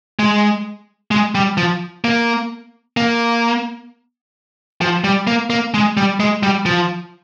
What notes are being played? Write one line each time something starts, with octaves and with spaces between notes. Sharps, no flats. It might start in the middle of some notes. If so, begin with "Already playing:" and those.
G#3
G#3
G3
F3
A#3
A#3
F3
G3
A#3
A#3
G#3
G3
G#3
G3
F3